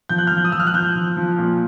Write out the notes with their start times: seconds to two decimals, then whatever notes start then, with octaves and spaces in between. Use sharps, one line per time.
0.09 F3 G6
0.18 F#6
0.27 F3 F6 G6
0.45 D#6
0.52 F3 E6
0.60 F6
0.67 F#6
0.73 F3 F6 G6
0.95 F3
1.17 F3
1.38 A#2